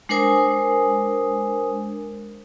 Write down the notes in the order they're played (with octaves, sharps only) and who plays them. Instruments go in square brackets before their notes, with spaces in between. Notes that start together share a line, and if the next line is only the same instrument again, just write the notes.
[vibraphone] G#3 D4 A#4 C5 G#5 D#6